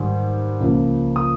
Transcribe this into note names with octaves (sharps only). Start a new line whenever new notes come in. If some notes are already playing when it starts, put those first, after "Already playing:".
Already playing: G#2 D#3 G3
C#2 C#3 F3 A#3
D#6